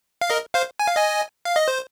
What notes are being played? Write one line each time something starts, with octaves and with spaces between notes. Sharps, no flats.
F5
A#4 D#5
C5 F5
G#5
F5
D#5 G#5
F5
D#5
C5